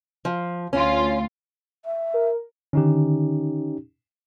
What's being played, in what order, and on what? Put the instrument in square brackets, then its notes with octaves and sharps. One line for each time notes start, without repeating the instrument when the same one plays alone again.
[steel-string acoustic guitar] F3
[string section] D2 F4 [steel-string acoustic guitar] C#4
[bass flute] E5
[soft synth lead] A#4
[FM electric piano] D3 D#3 [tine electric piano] C#4 D#4 G4